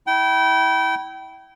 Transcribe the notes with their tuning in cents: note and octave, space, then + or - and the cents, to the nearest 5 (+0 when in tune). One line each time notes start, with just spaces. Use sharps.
E4 -25 G5 -30